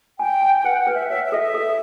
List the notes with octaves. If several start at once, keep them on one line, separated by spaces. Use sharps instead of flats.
G5 G#5
G#5
G5
B4 F#5
F#5
B4
E5
C#5 E5
E5
A4 D#5
E5
A4